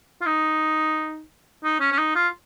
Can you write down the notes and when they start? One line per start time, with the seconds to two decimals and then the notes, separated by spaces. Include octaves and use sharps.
0.21 F4
0.26 D#4
1.64 D#4
1.80 C#4
1.92 C#4
1.98 D#4
2.16 F4